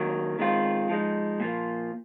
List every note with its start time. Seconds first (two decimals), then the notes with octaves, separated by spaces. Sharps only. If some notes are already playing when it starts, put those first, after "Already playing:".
Already playing: D#3 F#3 A#3
0.39 D#3 G#3 C4 F4
0.89 F3 G#3 D#4
1.40 A#2 F3 A#3